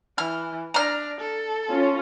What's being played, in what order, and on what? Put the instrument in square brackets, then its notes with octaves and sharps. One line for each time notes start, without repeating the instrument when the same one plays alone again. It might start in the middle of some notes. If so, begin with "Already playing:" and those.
[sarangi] E3 [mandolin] F6
[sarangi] D4 [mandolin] A#5 F6
[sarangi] A4
[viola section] C#4 F4